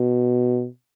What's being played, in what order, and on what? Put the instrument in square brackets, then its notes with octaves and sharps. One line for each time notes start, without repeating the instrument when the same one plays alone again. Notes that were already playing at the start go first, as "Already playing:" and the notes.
Already playing: [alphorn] B2